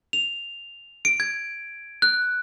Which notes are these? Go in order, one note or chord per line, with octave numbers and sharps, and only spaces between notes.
F7
D7
G#6
F#6